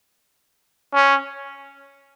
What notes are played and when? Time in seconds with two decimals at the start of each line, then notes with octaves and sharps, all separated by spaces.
0.94 C#4